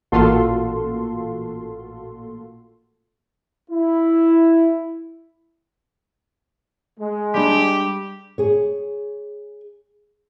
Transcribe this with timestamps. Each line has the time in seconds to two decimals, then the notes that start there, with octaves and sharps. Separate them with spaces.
0.12 A1 A#2 F4 F#4 A4 C6
3.71 E4
6.99 G#3
7.35 G3 D4 G4
8.38 G#4 C#5